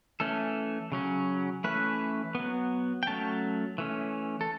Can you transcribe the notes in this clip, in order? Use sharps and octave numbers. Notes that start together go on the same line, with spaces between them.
E3 A3 C#4 A4
C#3 F#3 C#4
E3 A3 C#4 B4
F#3 B3
G5
F#3 A3 C#4 A5
E3 A3 C#4
A4